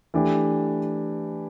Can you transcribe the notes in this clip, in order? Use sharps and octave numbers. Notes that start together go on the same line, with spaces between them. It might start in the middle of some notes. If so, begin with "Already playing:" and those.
E3 A3 D4 G4